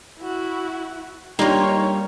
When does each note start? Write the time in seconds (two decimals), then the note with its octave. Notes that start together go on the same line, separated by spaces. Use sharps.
0.20 E4 F#4
1.39 G3 A#3 D4 D#4 F4 C#5 G5